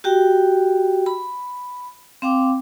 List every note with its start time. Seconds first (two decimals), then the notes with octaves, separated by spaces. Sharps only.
0.04 F#4 G4 G5
1.06 B5
2.22 C4 F5 G5 D6